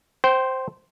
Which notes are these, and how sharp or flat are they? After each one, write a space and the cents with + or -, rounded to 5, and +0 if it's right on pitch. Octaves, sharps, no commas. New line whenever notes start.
C5 +0 G5 -25